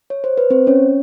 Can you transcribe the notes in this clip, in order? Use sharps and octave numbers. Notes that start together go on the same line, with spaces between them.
C#5
C5
B4
C4 C5
C#4 C#5